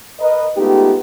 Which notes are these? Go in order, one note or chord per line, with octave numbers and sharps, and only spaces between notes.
A#4 B4 D#5
G#3 A3 B3 D#4 F4 G4